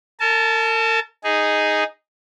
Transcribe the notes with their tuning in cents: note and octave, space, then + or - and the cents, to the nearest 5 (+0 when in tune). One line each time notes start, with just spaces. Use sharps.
A#4 -45 A5 -20
D#4 +0 G#4 -5